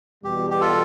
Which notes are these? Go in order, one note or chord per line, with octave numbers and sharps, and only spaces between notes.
E2 B2 G3 G4
G4
F4 A4